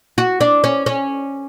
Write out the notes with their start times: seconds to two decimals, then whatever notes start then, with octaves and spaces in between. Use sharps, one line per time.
0.18 F#4
0.41 D4
0.64 C#4
0.86 C#4